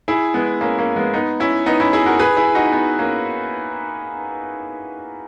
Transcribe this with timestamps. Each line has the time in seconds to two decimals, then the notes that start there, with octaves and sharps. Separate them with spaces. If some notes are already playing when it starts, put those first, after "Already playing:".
0.08 E4 G#4
0.34 G#3 B3
0.61 A#3 C#4
0.78 A#3 C#4
0.96 G#3 B3
1.14 B3 D#4
1.40 C#4 E4
1.66 B3 D#4
1.80 C#4 E4
1.93 E4 G#4
2.06 F#4 A#4
2.19 G#4 B4
2.37 E4 G#4
2.55 D#4 F#4
2.72 B3 D#4
2.99 A#3 C#4